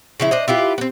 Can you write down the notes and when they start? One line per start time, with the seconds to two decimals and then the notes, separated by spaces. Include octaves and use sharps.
0.20 C#3 F3 E4
0.31 D4 C5 D#5
0.48 E4 F4 G4 B4
0.78 B3 C4